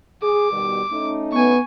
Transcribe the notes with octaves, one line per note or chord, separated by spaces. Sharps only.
G#4 D6
B2 D#3 G3
A3 C#4 D#4
B3 G#5 C#6